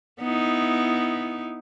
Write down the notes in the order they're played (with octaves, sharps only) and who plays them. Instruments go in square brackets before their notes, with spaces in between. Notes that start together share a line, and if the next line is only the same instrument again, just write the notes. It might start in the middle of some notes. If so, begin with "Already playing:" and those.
[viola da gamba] B3 D#4 E4